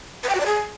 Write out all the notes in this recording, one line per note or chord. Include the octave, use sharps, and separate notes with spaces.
B4
G5
F#4
D5
G#4